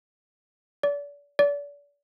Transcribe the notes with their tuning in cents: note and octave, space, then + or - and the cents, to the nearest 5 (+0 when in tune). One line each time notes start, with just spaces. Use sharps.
D5 -35
D5 -35